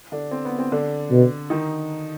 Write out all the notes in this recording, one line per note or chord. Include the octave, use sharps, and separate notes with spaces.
D3 D4
C4
B3
C4
D3 D4
B2
D#3 D#4